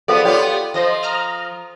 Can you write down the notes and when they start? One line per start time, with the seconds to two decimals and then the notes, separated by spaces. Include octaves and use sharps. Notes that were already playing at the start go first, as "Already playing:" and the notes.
0.08 F3 B3 G#4 A4 D5 F5
0.25 B3 F4 G4 C#5
0.74 F3 C5 D#5 A#6
1.03 A#5 D#6 F6